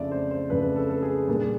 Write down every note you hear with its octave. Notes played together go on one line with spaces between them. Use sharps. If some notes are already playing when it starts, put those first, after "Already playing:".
Already playing: F2 C#3 F3 A3 D4 D5 E5
C5
C5
F2 C#3 F3 A3 D4 B4
A4
A4
G#4
A#2 G3 A#3 D4